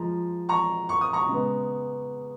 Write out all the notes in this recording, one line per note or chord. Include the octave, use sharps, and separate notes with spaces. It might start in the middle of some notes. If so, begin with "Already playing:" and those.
Already playing: F3 G#3 A#5
A#5 C#6
C#6
D#6
A#5 C#6
C#3 G#3 B3